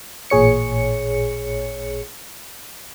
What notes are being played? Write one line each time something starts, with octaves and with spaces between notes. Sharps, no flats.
A1 A#2 G#4 C#5 C#7